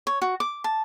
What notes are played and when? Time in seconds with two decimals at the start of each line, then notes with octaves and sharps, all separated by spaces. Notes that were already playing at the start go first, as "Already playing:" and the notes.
0.07 C#5
0.22 F#4
0.40 D6
0.64 A5